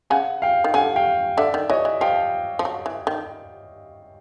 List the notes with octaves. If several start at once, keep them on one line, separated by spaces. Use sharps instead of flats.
C#3 F#5 G#5
F5 G5
D#3
D3 F#5 G#5
F5 G5
D3 D5 E5
D#3
E3 C#5 D#5
E3
F3 F5 G5
F3
F#3
E3
D#3